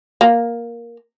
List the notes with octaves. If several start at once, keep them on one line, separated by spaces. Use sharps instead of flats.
A#3